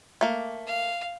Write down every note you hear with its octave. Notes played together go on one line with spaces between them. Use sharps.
A3 A#3
F5